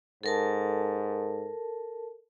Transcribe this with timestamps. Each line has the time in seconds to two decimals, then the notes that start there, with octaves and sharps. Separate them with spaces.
0.23 G#2 A4 A#4 A5